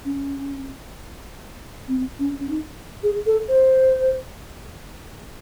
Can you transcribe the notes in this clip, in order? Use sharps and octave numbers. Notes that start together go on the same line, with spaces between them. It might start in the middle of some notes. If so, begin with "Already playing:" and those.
C#4
C4
C#4
C#4
D#4
G#4
A4
C5